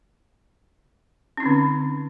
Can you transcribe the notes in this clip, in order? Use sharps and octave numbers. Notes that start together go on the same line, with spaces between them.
D3 C4 C#4 D#4